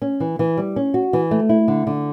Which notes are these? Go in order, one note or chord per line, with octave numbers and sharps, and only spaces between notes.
C#4
E3
E3
G3
C#4
F#4
E3
A3
E4
D3
D3